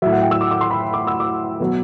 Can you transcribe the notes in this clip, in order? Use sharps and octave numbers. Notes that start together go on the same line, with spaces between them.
A2 F#3 E5
F#5
G5
E6
D6
D6
C6
B5
D6
E6
D6
B2 F#3